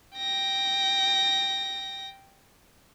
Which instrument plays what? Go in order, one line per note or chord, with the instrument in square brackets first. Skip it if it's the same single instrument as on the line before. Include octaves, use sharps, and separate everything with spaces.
[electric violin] G5 A#6